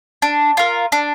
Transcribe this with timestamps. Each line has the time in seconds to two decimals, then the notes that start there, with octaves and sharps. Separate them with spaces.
0.22 D4
0.57 F4 A#4
0.92 D4